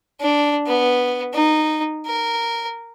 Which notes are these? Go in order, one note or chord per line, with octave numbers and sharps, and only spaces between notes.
D4
B3
D#4
A#4